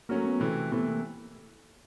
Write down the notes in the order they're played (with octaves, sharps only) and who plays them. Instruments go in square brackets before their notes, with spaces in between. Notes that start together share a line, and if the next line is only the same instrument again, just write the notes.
[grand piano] F#3 A3 C#4 F#4 A#4 [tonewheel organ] A#3
[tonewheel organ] B3
[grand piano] C3 E3 A3
[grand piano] C3 E3 A3 [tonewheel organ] B3
[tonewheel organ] A#3